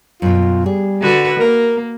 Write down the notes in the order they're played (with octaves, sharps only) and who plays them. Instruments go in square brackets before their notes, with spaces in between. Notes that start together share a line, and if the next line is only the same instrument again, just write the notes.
[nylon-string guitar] F#2 B2 [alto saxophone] F4
[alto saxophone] G3 [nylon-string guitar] G#4
[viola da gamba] D3 F#4 B4
[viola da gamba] A#3 [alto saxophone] A#4